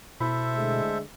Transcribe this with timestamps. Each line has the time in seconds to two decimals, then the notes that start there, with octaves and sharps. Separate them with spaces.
0.20 B2 E4 A4 C5 E5 B5
0.55 D3 G#3 A3